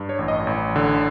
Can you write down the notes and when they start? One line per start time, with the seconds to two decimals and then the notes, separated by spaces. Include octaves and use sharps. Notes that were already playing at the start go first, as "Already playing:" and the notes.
Already playing: G2
0.09 C#5
0.19 A1
0.28 D#5
0.47 A1
0.76 D3